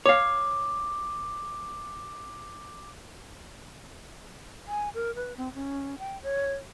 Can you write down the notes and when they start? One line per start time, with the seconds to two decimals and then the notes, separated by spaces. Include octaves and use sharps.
0.06 C#5 F5 D6
4.67 G#5
4.95 A#4
5.15 B4
5.37 C4
5.54 C#4
5.99 G5
6.23 C#5